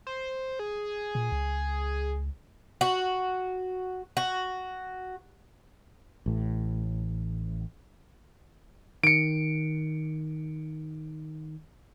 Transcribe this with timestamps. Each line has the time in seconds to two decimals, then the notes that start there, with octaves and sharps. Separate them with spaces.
0.07 C5
0.59 G#4
1.15 A#2
1.32 C#2
2.81 F#4
4.17 F#4
6.26 A1 A2
9.04 D#3 C#7 D7